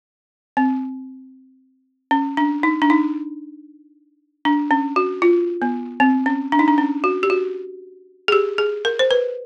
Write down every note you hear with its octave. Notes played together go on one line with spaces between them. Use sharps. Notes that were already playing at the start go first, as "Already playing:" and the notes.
C4
C#4
D4
D#4
D4
D#4
D4
C#4
F#4
F4
B3
C4
C#4
D4
D#4
D4
C#4
F#4
G4
F#4
G#4
G4
G#4
A#4
C5
B4